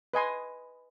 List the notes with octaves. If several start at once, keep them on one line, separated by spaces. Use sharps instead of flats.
B4 D#5 G#5 C6